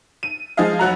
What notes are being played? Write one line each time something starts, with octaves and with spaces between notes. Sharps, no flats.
D#7
F3 G#3 G#4 D#5 F5
F1 F#3 F#4 A#5